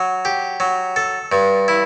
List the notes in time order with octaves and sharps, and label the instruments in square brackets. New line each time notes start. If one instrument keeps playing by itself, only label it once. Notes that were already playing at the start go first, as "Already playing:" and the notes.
Already playing: [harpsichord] F#3
G4
F#3
A4
G2
E4